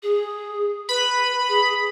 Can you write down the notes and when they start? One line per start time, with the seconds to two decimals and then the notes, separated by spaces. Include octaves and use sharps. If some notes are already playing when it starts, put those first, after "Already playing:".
0.03 G#4
0.89 B4 B5
1.49 G#4